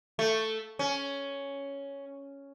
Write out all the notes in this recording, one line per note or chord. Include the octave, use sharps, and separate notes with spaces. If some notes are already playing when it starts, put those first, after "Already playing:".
A3
C#4